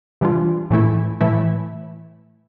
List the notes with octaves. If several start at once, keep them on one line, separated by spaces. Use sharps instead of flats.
C3 E3 G3 D4 F4
A2 E3 A3 E4
A2 E3 A3 E4